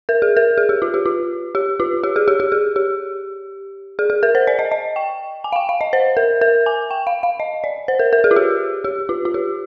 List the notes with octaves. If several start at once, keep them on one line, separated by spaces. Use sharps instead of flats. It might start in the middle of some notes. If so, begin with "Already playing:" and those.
A#4
G#4
A#4
G#4
G4
F4
G4
F4
G4
F4
G4
G#4
G4
G4
G#4
G4
G#4
G#4
A#4
C5
D5
D#5
D#5
G5
G#5
F5
G5
F5
D#5
C5
A#4
A#4
G#5
G5
F5
F5
D#5
D5
C5
A#4
A#4
G#4
F4
G4
G4
F4
F4
G4